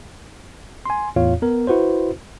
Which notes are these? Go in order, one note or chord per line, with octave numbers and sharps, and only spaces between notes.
G#5 C6
E2 A2 F4 C#5 F5
B3 A#4
E4 F#4 B4 C5